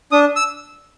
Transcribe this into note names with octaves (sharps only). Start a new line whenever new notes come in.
D4 D#6
E6